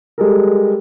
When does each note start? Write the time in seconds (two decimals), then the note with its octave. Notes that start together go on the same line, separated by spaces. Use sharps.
0.18 G3 G#3 A4 A#4